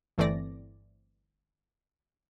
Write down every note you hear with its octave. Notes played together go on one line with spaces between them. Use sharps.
G1 E3 A3 C4 D5 A#6